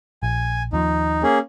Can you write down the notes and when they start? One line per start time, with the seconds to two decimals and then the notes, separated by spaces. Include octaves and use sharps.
0.23 A#1 G#5
0.73 D#2 F3 D#4
1.23 A#3 C#4 G#4